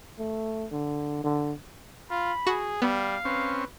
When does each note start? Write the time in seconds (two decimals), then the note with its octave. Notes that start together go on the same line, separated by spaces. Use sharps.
0.19 A3
0.71 D3
1.24 D3
2.10 F4 B5
2.47 F#4 G#4
2.82 G3 B3 F5
3.25 C4 C#4 B4